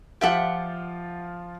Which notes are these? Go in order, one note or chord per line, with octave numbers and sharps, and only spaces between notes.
F3 F4 G4 E5 F#5